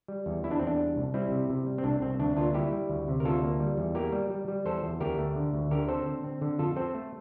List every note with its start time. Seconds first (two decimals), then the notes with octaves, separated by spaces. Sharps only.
0.08 G3
0.26 E2
0.44 E2 E4
0.51 D4
0.59 E2 C4
0.67 D4
0.79 G3
0.96 C2
1.14 G3 C4 E4
1.32 C3
1.50 C3
1.67 G3
1.78 C4
1.84 C2 D4
2.02 C2 C4
2.19 D2 D4
2.37 A#3 D4 F4
2.54 G3 E4 G4
2.72 G3
2.89 D2
3.08 C3
3.20 A#4
3.25 D2 F4 A4
3.42 A#3
3.60 G3
3.78 E2
3.95 A#3 G4 A#4
4.12 G3
4.30 G3
4.48 G3
4.65 E2 A4 C5
4.83 E2
5.00 D2 G4 A#4
5.18 A3
5.36 D3
5.53 D2
5.71 D3 G4 A#4
5.88 C4 A4 C5
6.06 D3
6.24 C4
6.42 D3
6.59 F2 F4 A4
6.76 C4 A4 C5
6.95 A3